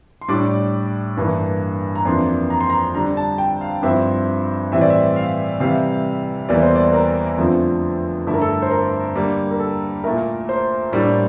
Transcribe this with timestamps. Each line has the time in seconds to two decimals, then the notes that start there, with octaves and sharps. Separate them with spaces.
0.21 C6
0.28 A2 G3 D4 D6
1.17 G2 E3 A#3
1.95 A#5
2.05 F2 E3 A#3 D4 C6
2.50 A#5
2.60 C6
2.70 A#5
2.95 D3 G3 D4 A#5
3.17 A5
3.38 G5
3.61 F5
3.83 G2 F3 C4 E4 E5
4.72 A2 E3 G3 C4 E4 E5
4.81 D5
4.90 E5
5.16 F5
5.60 C3 E3 G3 F5
6.49 E2 E3 G3 A#3 D5
6.62 C5
6.76 D5
6.93 A#4
7.38 F2 D3 F3 A3 C4
8.27 G2 D3 A3 E4 A4
8.34 A#4
8.42 A4
8.62 C5
8.71 A#4
9.15 D3 G3 A#3
9.51 A#4
9.59 A4
10.04 A#2 A3 E4 A#4
10.49 C5
10.92 A2 G3 A#3 D4